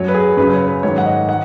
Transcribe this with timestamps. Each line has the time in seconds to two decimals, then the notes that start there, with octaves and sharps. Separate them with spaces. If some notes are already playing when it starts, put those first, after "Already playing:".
Already playing: F#2 F#3 C#5
0.08 B4
0.14 G#4
0.37 F#2 C#3 F#3 B4
0.53 C#5
0.68 B4
0.83 G#2 D#3 F#3 C#5
0.98 F#5
1.06 D#5
1.29 D#3 F#5